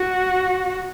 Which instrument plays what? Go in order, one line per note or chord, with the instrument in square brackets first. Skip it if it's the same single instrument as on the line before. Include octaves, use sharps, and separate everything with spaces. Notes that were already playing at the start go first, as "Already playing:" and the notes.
Already playing: [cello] F#4